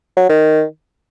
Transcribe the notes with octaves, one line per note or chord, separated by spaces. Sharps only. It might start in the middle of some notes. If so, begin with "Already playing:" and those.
F#3
D#3